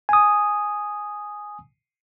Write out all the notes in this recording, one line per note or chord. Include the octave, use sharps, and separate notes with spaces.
G#5 D#6